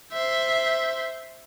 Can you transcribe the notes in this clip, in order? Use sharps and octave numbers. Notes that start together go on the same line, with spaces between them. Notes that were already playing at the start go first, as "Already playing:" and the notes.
C5 E5